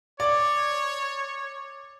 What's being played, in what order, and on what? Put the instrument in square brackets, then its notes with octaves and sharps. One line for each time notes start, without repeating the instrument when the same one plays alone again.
[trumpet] C#5 [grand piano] D5